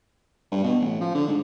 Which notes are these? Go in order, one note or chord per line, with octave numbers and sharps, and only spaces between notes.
G2
B2
A1
F3
D3
G#2